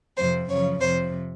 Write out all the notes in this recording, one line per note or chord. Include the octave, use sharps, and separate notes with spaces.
F2 C3 F3 C5
F#2 C#3 F3 C#5
F2 C3 F3 C5